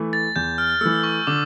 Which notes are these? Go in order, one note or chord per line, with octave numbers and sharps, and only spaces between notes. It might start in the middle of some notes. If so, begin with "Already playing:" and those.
Already playing: E3 A3
A6
E2 G6
F6
E3 A3 E6
C#6
D3 D6